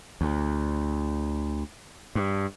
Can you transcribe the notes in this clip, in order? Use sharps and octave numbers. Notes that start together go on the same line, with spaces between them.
D2
G2